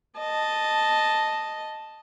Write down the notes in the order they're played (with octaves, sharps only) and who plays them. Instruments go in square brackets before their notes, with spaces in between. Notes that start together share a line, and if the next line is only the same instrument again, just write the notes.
[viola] D#5 A5